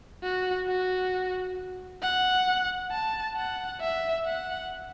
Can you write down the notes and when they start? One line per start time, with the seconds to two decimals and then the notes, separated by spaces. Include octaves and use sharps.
0.23 F#4
0.68 F#4
2.02 F#5
2.92 A5
3.37 F#5
3.81 E5
4.26 F#5